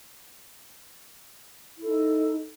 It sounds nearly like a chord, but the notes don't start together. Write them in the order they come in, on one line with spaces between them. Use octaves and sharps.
E4 A4 D#4